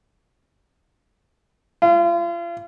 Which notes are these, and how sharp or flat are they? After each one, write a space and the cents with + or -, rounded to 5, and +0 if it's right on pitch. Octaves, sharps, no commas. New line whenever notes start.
F4 -35